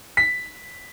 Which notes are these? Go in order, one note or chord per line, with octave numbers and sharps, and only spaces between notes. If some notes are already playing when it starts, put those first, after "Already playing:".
B6